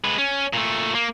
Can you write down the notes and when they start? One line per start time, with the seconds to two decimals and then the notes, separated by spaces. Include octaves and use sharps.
0.04 G#3 B4
0.18 C#4
0.53 A#2 A3
0.95 A#3